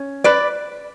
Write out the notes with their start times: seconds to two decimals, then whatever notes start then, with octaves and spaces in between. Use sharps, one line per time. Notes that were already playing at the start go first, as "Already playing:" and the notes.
Already playing: C#4
0.24 B4 D5